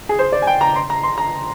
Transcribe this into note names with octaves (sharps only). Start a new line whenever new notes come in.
G#4
C5
D5
G#5
G5
A#5
C6
A#5
C6
A#5